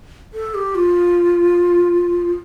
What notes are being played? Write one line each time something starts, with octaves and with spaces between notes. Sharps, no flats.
A4
G4
F4